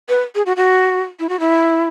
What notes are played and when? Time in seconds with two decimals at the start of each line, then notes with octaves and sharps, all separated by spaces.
0.09 B4
0.35 G#4
0.46 F#4
0.57 F#4
1.20 E4
1.29 F#4
1.40 E4